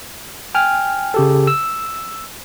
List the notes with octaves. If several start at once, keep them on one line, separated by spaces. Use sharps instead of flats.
G5 G#5 F6
C#3 G4 A4
E6